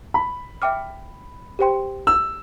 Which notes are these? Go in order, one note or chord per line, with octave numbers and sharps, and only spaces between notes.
B5
E5 G5 D6 F6
G4 C5 G5 C6
E6